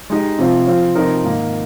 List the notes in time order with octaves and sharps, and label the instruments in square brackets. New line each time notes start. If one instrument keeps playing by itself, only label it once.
[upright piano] G#3 D#4 G4
C3 F3 C4 F4
F3 C4 F4
C3 F3 C4 D#4 A#4
G#2 D#3 A#3